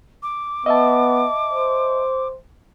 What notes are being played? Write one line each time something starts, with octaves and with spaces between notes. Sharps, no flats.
D6
B3 D#5 E5 A5
C5